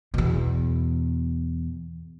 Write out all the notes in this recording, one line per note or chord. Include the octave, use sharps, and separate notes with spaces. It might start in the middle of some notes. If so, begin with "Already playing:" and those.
E2 B2